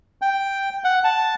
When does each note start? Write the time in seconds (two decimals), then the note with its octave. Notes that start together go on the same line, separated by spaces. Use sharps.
0.22 G5
0.84 F#5
1.04 A5